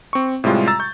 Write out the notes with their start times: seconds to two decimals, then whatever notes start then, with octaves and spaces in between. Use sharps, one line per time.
0.13 C4 C#6
0.44 A2 C3 G3 G#3 F4
0.67 A#5 E6 A6
0.79 C#6 G6